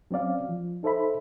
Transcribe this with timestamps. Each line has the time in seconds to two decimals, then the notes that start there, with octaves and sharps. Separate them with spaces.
0.11 F#3 C4 C#4 D5 F5
0.49 F3
0.83 D#4 A4 C5 E5 B5